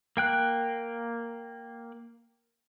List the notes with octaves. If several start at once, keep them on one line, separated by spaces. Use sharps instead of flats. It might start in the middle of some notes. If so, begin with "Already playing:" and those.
A#3 G5 F#6